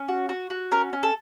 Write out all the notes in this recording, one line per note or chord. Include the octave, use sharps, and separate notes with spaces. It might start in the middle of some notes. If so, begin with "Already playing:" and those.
Already playing: C#4
F#4
F#4
F#4
C#4 A#4
C#4
A4